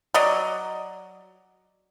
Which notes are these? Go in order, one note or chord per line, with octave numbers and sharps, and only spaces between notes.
F#3 D5 D#5